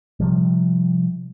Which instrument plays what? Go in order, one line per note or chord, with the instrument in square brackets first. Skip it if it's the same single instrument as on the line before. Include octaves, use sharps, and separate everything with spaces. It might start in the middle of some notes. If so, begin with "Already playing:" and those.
[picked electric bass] C3 F3 G3